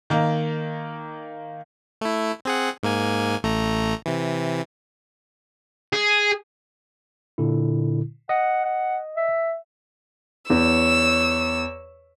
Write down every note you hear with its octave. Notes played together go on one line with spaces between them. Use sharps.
D#3 A#3
A3 E4
C4 G#4 F#5
G#2 A#3 G#5
A1 A3 A#5
C3 E3
G#4
A#2 D3 E4
D#5 F#5
F#5
E5
E2 C#5 E6